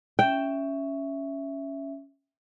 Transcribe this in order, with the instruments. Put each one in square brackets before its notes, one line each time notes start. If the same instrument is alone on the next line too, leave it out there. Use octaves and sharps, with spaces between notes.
[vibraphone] C#4 E5 [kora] G5